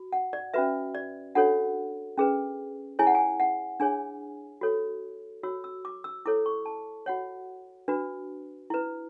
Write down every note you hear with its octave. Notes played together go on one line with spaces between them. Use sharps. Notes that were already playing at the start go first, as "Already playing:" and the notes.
Already playing: F#4
F#5
D5
C#4 F#4 B4 E5
D5
D4 F#4 A4 C#5 F#5
C#4 G#4 B4
E4 G#4 C#5 G#5
F#5
G#5
F#5
D4 G#4 C#5 G#5
F#4 A4 C#5
F#4 C#5 E6
E6
D6
E6
E4 A4 C#5 D6
C#6
A5
F#4 C#5 F#5
D4 F#4 B4
E4 B4